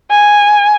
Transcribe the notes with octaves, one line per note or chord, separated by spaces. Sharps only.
G#5